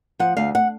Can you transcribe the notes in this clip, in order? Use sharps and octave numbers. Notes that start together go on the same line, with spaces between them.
F3 F#5
D2 F5
F#5